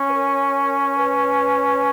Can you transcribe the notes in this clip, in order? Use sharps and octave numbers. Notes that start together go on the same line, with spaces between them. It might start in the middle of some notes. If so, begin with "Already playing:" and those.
Already playing: C#4
B4
A#4
B4